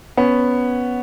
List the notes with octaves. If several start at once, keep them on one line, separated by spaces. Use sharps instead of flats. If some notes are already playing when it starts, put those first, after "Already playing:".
B3 C#4